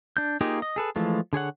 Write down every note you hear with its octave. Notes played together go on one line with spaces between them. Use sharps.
D4 G6
A#3 D#4 F4 G4 G#4
D#5
G#4 A4 B4
E3 F3 G#3 A3 F4
D3 G#4 C#5 F#5